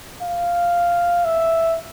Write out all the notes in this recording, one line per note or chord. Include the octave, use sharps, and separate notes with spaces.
F5
E5